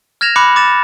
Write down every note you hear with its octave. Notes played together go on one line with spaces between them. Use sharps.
F6 G#6 A#6 E7 F7
B5 D6 F#6 C#7
D6 A6 E7